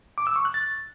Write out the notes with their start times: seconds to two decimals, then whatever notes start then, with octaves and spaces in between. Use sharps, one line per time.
0.18 D6
0.27 E6
0.36 C#6
0.45 F#6
0.54 A6